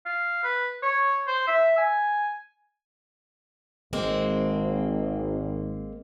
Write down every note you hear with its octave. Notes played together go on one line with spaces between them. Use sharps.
F5
B4
C#5
C5
E5
G#5
G#1 G#3 A#3 C4